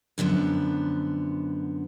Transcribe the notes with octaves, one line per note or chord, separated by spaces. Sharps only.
F#2 D3 F3 B3